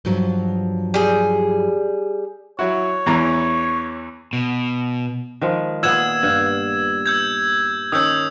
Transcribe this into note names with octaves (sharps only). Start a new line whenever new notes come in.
G2 F3 F#3
G3 G#4
F#3 E4 F#4 C#5
E2 E3 A#5
B2
D#3 F3 G#3
A#2 B3 G#4 E6 G#6 E7
G2 F5
E6 G6 G#6
D#3 C#4 D#6 E6 G6